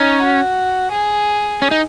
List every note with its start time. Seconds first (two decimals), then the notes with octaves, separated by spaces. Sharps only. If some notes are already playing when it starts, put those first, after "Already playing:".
Already playing: C#4 D#4
0.22 F#4
0.92 G#4
1.62 C#4
1.71 D#4